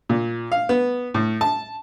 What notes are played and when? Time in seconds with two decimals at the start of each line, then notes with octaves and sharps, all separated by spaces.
0.09 A#2
0.52 F5
0.69 B3
1.14 A2
1.41 A5